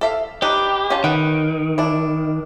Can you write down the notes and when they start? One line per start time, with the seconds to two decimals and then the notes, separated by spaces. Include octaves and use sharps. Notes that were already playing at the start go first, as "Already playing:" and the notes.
0.01 A4 E5 F5
0.42 D4 D#4 G4 B4
0.90 C#4 F4 A5
1.04 D#3 B4 F#5 G5
1.78 D4 E4